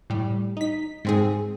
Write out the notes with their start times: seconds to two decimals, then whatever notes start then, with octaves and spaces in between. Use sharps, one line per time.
0.10 A2 G3
0.57 D#4 B6
1.05 G#2 C4 G#4